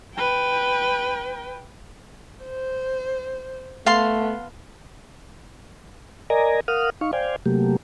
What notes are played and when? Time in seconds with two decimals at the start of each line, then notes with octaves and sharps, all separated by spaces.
0.15 B4 G5
2.44 C5
3.86 A3 B3 F5 A5 C6
6.30 A#4 D5 D#5 G#5 A#5
6.68 A#4 F5 F#5 D#6 F6
7.01 D#4 F5 C#6
7.13 C5 D5 F5 G5 G#5
7.46 C3 F#3 A3 A#3 G4